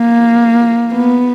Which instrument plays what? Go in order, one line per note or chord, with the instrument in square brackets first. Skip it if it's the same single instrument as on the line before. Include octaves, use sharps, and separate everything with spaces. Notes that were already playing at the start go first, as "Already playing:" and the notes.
Already playing: [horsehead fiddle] A#3
B3